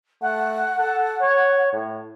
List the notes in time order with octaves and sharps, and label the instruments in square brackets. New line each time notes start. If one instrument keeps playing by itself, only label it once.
[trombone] A3 [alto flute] F#5
[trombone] A4
C#5
A2